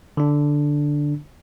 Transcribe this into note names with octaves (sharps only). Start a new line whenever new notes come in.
D3 D4